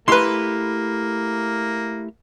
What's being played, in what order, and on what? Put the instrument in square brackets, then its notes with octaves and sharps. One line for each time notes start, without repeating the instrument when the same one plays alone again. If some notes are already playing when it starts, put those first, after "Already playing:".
[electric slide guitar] A3 E4 G4 [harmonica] A#3 [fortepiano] B4 C6